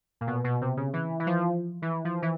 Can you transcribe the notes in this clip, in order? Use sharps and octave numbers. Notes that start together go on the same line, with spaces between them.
A#2
B2
B2
C3
C#3
E3
E3
F3
E3
F3
E3